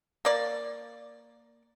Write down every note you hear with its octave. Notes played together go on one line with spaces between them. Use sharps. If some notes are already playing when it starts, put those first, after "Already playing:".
A#3 D5